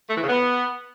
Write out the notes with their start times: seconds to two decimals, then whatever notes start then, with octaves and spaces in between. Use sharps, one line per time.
0.10 A3
0.16 E3
0.22 C#3
0.28 B3